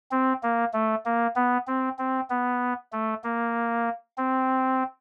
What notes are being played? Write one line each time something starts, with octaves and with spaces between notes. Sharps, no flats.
C4
A#3
A3
A#3
B3
C4
C4
B3
A3
A#3
C4